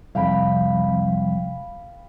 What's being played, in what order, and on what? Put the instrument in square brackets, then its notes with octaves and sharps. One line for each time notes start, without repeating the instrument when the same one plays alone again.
[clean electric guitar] C2 F2 [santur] F5 G5 B5